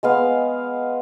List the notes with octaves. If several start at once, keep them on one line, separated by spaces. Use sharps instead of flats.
G#3 B3 F5